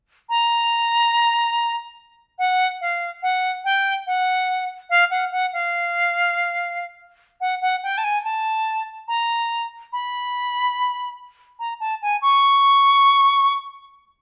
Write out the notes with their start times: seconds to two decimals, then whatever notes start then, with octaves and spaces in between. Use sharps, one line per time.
0.29 A#5
2.38 F#5
2.81 F5
3.22 F#5
3.64 G5
4.06 F#5
4.89 F5
5.10 F#5
5.31 F#5
5.53 F5
7.40 F#5
7.61 F#5
7.83 G5
7.97 A5
8.04 G#5
8.24 A5
9.08 A#5
9.92 B5
11.59 A#5
11.80 A5
12.02 G#5
12.22 C#6